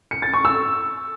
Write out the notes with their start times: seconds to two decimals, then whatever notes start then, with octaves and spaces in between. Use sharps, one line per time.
0.11 C#7
0.22 A6
0.34 C#6
0.45 E6